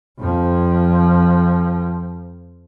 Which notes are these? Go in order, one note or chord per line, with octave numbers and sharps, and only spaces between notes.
F2 F3